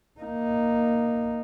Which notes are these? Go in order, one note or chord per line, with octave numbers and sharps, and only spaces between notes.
A#3 D#4